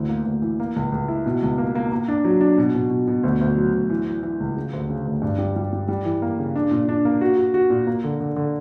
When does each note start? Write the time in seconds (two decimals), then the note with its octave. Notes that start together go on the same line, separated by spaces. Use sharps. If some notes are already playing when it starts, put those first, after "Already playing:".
Already playing: D2 E3
0.09 A#3
0.25 D2
0.42 E3
0.60 A#3
0.76 C#2
0.92 C#2
1.08 E4
1.26 B2
1.42 C#2
1.58 A#3
1.75 A#3
1.92 A#3
2.08 D4
2.25 F#3
2.41 D4
2.58 B2
2.75 B2
2.90 B2
3.08 B2
3.23 D2
3.41 D2
3.57 F#3
3.73 D2
3.90 E3
4.06 E3
4.23 E3
4.40 C#2
4.57 C#3
4.73 D2
4.90 C#3
5.06 D2
5.22 G2
5.38 G3
5.56 G3
5.73 G3
5.88 G3
6.05 E3
6.22 A#3
6.39 C#3
6.56 D4
6.71 A#2
6.89 D4
7.05 A#3
7.21 F#4
7.37 F#4
7.54 F#4
7.70 A#2
7.87 A#3
8.04 D3
8.20 D3
8.36 D3